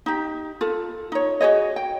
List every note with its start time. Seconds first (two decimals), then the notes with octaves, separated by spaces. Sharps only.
0.06 D#4 G4
0.61 F4 A4
1.12 D#4 C#5
1.41 F#4 G#4 C#5 D#5
1.76 G5